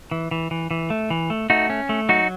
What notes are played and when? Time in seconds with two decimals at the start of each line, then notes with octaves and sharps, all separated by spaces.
0.11 E3
0.31 E3
0.51 E3
0.71 E3
0.90 A3
1.10 E3
1.30 A3
1.50 A3 D#4 F#4
1.70 C#4
1.89 A3
2.09 F#3 D#4 F#4